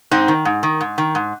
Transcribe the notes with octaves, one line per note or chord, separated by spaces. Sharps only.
G#2 C4 D#4
D#3
G#2
D#3
G#2
D#3
G#2